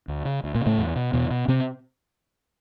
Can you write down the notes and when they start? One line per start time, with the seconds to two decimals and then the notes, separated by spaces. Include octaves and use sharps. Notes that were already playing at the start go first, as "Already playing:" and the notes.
0.08 D2
0.25 C#3
0.44 D2
0.55 A#2 A#3
0.61 C#3
0.66 A2 A3
0.78 E2
0.96 B2
1.13 E2 B2 B3
1.30 B2
1.48 C3 C4